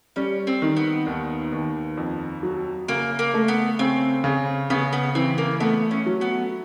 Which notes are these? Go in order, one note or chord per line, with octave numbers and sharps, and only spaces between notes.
G3 C#4
C4
D#3
B3
D#2
D#2
F2
F#3
C#3 A#3
A#3
A3
B3
C#3 C4
C#3
C#3 B3
B3
E3 C4
A#3
A3 B3
C#4
F#3
B3